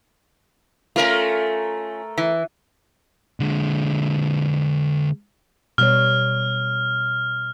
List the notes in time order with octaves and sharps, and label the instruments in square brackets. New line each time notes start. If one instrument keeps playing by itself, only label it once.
[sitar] A3 A#4 [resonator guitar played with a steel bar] C#4 F4
[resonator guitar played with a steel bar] E3
[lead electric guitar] D3 G#3
[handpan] B2 G3 C#5 [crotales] F6